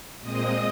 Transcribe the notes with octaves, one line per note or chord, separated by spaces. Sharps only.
A#2 G#3 C4 D#5 D#6